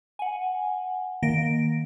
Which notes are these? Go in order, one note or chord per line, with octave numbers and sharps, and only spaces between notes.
F#5 G#5
D#3 A#3 A#6 D7